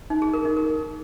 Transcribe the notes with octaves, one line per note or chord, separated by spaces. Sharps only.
D#4
G#4
A#4
D#4
A#4